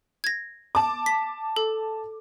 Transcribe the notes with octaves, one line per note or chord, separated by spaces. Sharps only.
G#6 A#6
A5 D6
B6
A4